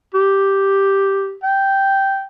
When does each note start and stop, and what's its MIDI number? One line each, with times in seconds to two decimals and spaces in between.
0.14 1.35 67
1.44 2.24 79